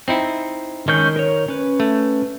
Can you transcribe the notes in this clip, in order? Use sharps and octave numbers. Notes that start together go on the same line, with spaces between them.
C4 D#4 E4
D#3 G#3 C#4 G6
A#4 C#5
C#4 B4
A3